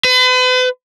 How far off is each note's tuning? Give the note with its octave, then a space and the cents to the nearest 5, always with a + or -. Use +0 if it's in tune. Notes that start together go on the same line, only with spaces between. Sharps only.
B4 +40